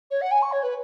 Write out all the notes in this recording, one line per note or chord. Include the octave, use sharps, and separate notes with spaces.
C#5
F#5
G#5
C#6
C#5
B4